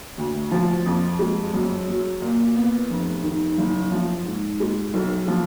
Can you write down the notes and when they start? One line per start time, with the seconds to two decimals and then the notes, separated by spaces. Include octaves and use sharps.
0.18 D2
0.51 F3
0.86 F2
1.19 G#3
1.54 F#2
1.88 F#3
2.22 A#2
2.56 B3
2.90 F1
3.23 D#3
3.58 F#1
3.92 F3
4.26 G#2
4.60 G#3
4.94 B1
5.28 F3